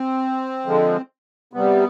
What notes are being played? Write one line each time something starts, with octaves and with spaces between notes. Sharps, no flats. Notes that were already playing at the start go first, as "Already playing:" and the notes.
Already playing: C4
D3 F3 G#3
C3 G3 B3